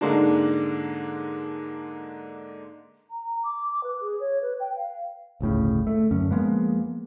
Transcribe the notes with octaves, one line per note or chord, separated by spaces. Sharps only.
G#2 D3 G#3 A#3 D4
A#5
D6
B4
G#4
C#5
B4
G5
F5
G1 D2 A2 C#3
A3
F#2 D3 C#4
F3 G#3 A#3 B3